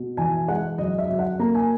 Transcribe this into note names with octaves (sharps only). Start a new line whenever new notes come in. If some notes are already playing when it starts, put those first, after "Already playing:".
Already playing: B2
E3 G#5
G#3 F#5
F#2 D#5
E5
F#2
F#5
A#3 A#5
G#5